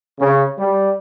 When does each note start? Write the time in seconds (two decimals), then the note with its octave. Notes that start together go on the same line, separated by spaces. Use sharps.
0.19 C#3
0.58 G3